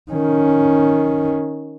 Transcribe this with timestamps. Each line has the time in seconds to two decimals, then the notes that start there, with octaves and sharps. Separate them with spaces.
0.12 D#3 C#4